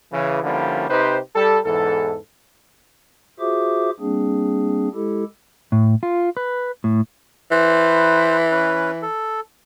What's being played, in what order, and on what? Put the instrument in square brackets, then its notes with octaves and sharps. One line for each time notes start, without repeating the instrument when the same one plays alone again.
[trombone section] C#3 E3
D3 F3 G3 A#3 C#4 E4
C3 D#4 G4 B4 C5
G3 A4
E2 G#2 E3 A4
[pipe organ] F4 F#4 G#4 C5 E5 D6
G3 A#3 C4 D4 G#4
G#3 E4 G4 A4
[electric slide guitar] A2
F4
B4
A2
[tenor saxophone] E3 [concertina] B4 C5
[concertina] C#4 B4
A4